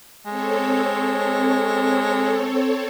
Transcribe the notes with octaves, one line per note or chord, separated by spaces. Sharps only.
G#3 C4 A4 C#5